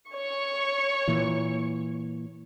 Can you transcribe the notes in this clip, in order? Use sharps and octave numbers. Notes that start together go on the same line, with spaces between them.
C#5 C#6
A#2 E3